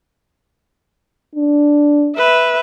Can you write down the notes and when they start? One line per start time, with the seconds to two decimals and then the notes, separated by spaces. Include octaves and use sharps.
1.35 D4
2.16 B4 E5